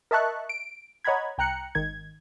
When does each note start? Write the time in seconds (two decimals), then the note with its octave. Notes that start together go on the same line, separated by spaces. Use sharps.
0.11 A#4 D#5 E5 A5 C#6 F#6
0.49 D7
1.04 C#5 D#5 F#5 A#5 B5 G#6
1.38 C2 G5 A#5 F#6 C#7
1.75 G#1 D#3 G#6